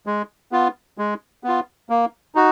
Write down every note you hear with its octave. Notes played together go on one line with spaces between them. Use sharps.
G#3
B3 F4
G#3
B3 F4
A#3
D#4 F#4